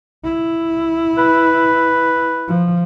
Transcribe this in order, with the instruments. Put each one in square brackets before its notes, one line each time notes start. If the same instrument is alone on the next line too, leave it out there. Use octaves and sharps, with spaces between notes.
[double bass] E4
[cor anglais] B4
[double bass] F3